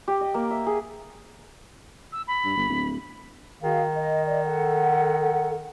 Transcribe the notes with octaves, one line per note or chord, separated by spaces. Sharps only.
G4
D#5
A#3
E5
G#4
E6
B5
G2
G1
D1
D#3 F#4 G#4 F5
D#5
D5 D#5
A4 F#5